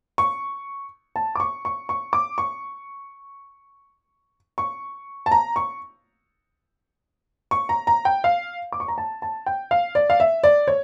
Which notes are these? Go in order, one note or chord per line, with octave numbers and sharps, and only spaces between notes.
C#6
A5
D6
C#6
C#6
C#6
D6
C#6
C#6
A5
A#5
C#6
C#6
A#5
A#5
G5
F5
D6
C#6
A#5
A5
A5
G5
F5
D5
F5
E5
D5
C#5